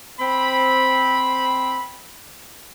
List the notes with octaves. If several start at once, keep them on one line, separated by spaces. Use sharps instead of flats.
C4 B5